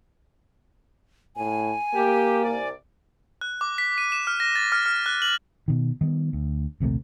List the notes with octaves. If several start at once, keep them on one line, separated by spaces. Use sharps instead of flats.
A2 G#5
A#3 G4
C2 D5
F#6
D6
B6
D#7
E7
F6
A#6
A6
F6
F6
F#6
F#7
B2 D#3
D#3 G3 B3
D2
A#1 D#2 C3 A3